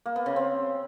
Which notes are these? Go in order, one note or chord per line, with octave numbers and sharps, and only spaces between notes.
A#3
B3
C#3
C4